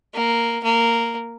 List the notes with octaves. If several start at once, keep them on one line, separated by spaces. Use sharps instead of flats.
A#3
A#3